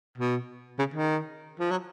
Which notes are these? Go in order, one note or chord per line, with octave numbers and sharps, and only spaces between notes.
B2
C#3
D#3
F3
F#3